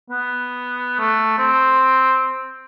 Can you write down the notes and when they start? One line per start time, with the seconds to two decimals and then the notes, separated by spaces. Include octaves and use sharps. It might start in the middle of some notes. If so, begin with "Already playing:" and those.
0.10 B3
0.99 A3
1.38 C4